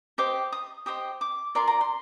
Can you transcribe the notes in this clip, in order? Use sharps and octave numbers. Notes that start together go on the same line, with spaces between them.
G4 C5 D#5 D6
D#6
G4 C5 D#5 D#6
D6
F4 A#4 D5 C6
A#5
C6